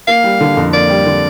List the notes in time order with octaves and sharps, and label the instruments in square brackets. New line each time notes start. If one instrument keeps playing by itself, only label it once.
[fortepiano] A#3 [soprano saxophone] F5
[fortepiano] G3
D3
F2
[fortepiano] A#3 [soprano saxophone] D5
[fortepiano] G3
D3